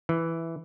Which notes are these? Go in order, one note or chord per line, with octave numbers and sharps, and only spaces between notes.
E3